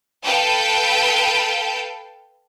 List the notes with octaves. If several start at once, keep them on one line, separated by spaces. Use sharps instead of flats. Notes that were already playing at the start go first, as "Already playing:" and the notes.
A4 B4 F5 G5 A5